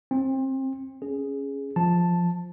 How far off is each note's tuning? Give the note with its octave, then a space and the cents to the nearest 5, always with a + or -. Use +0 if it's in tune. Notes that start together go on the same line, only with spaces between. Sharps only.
C4 +25 G5 +35
C#4 +0 G#4 +0
F3 +0 A5 +0